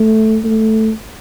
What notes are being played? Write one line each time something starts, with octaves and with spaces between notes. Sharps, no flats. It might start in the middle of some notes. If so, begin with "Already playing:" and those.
Already playing: A3
A3